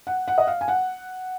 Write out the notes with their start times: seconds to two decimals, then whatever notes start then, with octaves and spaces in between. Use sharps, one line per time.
0.07 F#5
0.28 F#5
0.38 D#5
0.47 F5
0.61 G#5
0.68 F#5